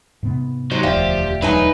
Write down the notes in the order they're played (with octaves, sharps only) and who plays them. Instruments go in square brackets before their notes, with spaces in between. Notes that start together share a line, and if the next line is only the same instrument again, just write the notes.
[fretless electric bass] G#2 C3 B3
[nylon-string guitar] F#3 [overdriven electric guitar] D#4 C5
[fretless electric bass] E1 D2 [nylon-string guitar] F3 [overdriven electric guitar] G4 [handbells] D5 E5 F5
[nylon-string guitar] F#3 D#4 G#5 [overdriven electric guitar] B4